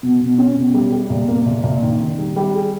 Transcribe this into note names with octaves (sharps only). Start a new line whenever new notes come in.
B2
B2
C#4
B2
G3
G3
A#2
A#3
A#2
A#2
D#3
D#3
G3
G3
G#4